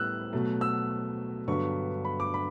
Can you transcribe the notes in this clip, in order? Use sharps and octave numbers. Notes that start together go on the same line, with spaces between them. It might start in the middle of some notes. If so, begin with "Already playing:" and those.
Already playing: A2 G3 B3 E6 F#6
B2 F#3 A3
E6
G2 D3 F#3 B3 C#6
B5
D6
B5